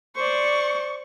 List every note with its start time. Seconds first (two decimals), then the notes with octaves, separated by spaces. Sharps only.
0.16 C5 D5 C#6